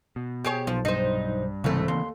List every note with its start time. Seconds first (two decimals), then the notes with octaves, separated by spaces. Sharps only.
0.16 B2
0.45 G4 G#4 C#5
0.67 B1 F3
0.85 G2 D#4 C5
1.64 C2 G#2 C#3 E3 A3 C4
1.88 D#2 C6